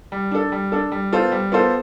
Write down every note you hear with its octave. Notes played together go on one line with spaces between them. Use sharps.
G3
D4 A4
G3
D4 A4
G3
B3 F4 A4 C5
G3
B3 F4 A4 C5